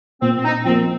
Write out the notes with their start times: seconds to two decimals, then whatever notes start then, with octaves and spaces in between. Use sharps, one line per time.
0.22 A#2 C4
0.38 C4
0.44 D#4
0.65 F3 A#3 C4